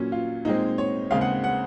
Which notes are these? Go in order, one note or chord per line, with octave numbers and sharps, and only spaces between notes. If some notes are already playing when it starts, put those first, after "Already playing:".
Already playing: A#2 F#3 C#4
F4
A#2 G#3 C4 D#4
C#5
D#2 C#3 G#3 C4 F5
F#5
F#5